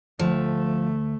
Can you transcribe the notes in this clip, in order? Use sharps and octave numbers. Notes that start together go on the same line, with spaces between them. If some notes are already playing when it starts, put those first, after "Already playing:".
D2 F3 A3